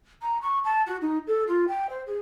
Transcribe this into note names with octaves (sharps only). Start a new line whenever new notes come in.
A#5
C#6
A5
F#4
D#4
A4
F4
G5
C5
G#4